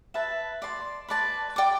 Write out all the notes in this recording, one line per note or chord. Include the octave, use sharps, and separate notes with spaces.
B4 E5 A5
D5 A5 C6
B4 D5 A5
D5 G5 D6